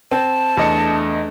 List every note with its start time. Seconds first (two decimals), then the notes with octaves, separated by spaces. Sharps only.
0.11 C4 A5
0.57 E2 A3 D4 D#5 C#7